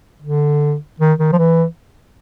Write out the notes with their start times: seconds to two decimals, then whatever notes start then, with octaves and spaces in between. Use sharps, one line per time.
0.22 D3
1.00 D#3
1.19 D#3
1.33 F3
1.38 E3